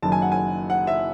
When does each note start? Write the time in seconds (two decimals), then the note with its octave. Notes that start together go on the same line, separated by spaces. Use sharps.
0.02 F#1 F#2 D#3 A5
0.12 G#5
0.22 F#5
0.32 G#5
0.70 F#5
0.87 E5